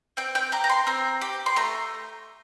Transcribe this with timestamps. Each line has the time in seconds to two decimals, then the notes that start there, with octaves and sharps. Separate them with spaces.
0.17 C4 G5
0.35 G5
0.52 G4 A#5
0.64 A#5
0.69 C6
0.87 C4 A#5
1.21 G4
1.46 C6
1.56 A3 A#5